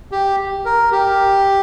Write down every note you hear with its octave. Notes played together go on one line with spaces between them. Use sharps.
G4
A#4
G4